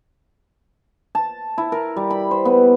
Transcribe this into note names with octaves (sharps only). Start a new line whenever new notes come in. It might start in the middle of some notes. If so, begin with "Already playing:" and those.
A5
E4
A#4
G3
B5
C5
B3